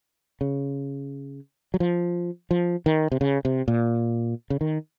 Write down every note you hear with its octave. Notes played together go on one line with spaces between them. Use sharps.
C#3
F#3
F3
F3
D#3
C3
C#3
C3
A#2
C#3
D#3